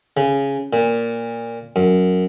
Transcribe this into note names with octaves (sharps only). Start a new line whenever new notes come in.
C#3
A#2
F#2